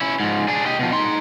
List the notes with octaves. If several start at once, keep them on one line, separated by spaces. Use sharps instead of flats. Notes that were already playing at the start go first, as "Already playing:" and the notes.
C#4 E4
G#2 F3
D4 G#4
G4 D#5
B2 F3
D#4 C6